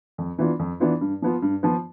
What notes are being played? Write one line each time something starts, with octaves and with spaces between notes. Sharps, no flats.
F2
E3 B3 D4 F4
F2
E3 B3 D4 F4
G2
F3 B3 F4
G2
F3 B3 F4